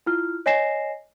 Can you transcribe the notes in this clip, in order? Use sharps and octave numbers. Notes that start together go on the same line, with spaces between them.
E4 F4 F6
C#5 D#5 G#5 A#6 C7 E7